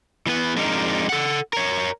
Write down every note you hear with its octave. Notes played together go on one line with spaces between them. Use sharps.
E3 B3 B4
F2 G#3 D4 D#4 A#4
A4 F#5
A#4 C#5